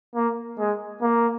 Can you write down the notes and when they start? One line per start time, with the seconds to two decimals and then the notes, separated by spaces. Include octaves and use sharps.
0.15 A#3
0.59 G#3
1.02 A#3